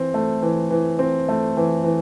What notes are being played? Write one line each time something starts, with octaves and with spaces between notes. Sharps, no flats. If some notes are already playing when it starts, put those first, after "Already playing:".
Already playing: E3 C4
A3
E3
E3
C4
A3
E3
E3